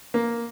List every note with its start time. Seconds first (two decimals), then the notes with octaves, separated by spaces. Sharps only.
0.14 A#3